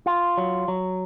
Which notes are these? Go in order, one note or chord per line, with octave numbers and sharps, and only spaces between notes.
F4
F#3
F#3